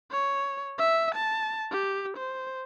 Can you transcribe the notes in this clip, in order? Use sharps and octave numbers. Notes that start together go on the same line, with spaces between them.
C#5
E5
A5
G4
C5